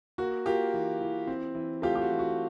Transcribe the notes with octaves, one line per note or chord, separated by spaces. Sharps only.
A#3 F#4
A#3 F4 G4
E3
E3
C4
E3
A3 F4 G4
G4
F#4
E3
F#4